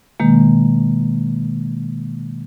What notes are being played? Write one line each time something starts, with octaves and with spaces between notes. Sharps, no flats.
B2 D#3 G#3 A#3